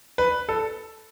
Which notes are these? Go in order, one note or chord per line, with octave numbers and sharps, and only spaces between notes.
B4
A4